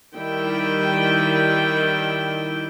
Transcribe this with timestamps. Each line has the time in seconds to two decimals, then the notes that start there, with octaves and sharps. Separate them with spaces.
0.15 D#3 G3 E4 G5